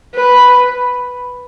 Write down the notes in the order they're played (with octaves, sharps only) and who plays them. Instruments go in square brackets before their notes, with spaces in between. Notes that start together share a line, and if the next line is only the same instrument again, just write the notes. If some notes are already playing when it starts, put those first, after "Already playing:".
[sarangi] B4